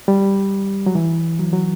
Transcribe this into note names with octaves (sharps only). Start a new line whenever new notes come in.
G3
F#3
E3
F#3
F#3